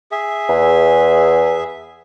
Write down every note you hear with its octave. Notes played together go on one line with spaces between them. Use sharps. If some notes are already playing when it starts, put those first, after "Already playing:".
G#4 E5
E2